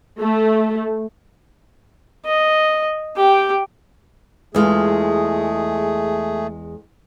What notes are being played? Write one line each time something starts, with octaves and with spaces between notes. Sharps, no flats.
A3
D#5
G4 G5
E2 G#3 A3 F4 G#4